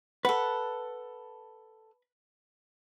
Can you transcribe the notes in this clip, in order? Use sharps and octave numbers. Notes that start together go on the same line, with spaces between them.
A4 B4 F#5